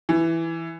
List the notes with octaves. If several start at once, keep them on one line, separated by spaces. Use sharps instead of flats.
E3